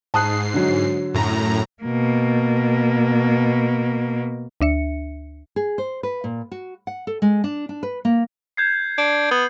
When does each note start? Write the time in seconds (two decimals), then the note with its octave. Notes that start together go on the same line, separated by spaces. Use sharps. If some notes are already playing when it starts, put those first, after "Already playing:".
0.14 G#2 A5 D#6 F#6 C7
0.54 D3 F#3
1.14 F#2 A2 A#5
1.83 B2 A#3
4.61 D2 D4 E5 C#7
5.56 G#4
5.78 C5
6.03 B4
6.24 A#2
6.52 F#4
6.87 F#5
7.07 A4
7.22 G#3
7.44 D4
7.69 D4
7.83 B4
8.05 A#3
8.57 G6 G#6 C7
8.98 D4
9.31 B3